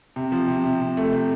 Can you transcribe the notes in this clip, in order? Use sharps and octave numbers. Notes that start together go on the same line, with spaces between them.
C3
F3
C3
C3
C3
A3
C3